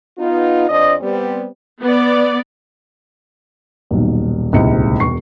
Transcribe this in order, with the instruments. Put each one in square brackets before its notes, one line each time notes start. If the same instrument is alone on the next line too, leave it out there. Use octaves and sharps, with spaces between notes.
[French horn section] B3 D#4 F4
F2 D4 C5 D5 D#5
G3 B3 C4
[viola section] B3 D5
[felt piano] D#1 B1
D#1 C#2 G#2 C3 E4 C#7
E1 E2 C#6 C7